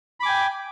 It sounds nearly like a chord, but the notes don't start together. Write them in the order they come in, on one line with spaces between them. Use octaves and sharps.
B5 D6 G#5 G5